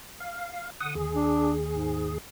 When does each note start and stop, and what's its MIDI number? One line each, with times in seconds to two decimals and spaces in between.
0.20 0.70 77
0.80 1.06 50
0.80 0.94 78
0.80 0.94 87
0.95 2.18 39
0.95 2.18 68
1.15 1.53 62
1.69 2.11 44